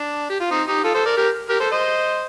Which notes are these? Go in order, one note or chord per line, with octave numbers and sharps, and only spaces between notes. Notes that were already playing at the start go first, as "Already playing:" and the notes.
Already playing: D4
G4
F4
C4 D#4
D#4 G4
F4 A4
A4 C5
A#4 D5
G4 A#4
G4 A#4
A4 C5
C5 D#5